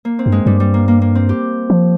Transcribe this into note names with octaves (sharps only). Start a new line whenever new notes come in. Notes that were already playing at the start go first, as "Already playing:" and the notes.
A#3
C4
G2
G#3
G2 G3
G3
A#3
A#3
A#3
C4
G4
F3